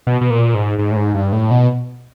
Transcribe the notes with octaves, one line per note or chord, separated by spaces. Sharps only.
B2
B2
A#2
G#2
G#2
A2
G#2
G2
A2
B2